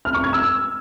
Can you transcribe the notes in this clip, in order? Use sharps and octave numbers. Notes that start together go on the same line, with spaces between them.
F6
C#6
G#6
E6